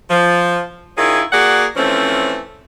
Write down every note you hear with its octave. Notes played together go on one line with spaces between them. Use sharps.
F3
D#3 C#4 E4 F4 G#4
A#3 F#4 G#4 D5 F#5
E3 F3 A3 C4 C#4